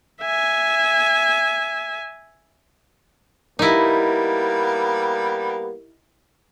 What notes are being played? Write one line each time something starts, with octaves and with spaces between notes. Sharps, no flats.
E5 G#5
G3 A#3 B3 D#4 E4 G4 A#4